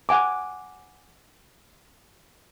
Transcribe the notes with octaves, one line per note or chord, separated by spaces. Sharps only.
F#5 G#5 D6